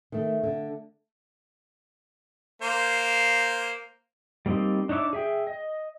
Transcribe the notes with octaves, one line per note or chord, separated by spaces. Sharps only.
D#3 A3
D3
A#3 C5
G3 A#3 C4 D#4
D4 D#4 C#5 E5 D6
G#4 E5 G5
D#5